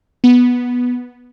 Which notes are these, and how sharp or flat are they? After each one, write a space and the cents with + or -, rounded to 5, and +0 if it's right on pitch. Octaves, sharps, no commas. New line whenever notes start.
B3 -5